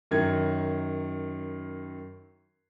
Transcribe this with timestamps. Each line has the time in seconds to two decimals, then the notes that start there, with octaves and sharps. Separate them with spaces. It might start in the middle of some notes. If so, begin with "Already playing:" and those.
0.11 F#2 D#3 G#6